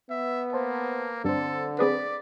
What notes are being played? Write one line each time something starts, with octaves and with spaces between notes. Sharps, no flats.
B3 E5
A#3 B4 C5 A5
G2 D3 C4 D4 A4 C5
C4 G#4 B4 D5 B6